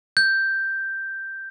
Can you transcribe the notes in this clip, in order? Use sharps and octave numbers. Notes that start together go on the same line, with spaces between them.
G6